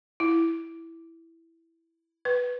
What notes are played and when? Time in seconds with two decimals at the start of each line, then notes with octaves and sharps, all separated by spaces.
0.20 E4
2.25 B4